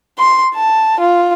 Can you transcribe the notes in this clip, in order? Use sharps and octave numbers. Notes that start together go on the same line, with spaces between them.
C6
A5
F4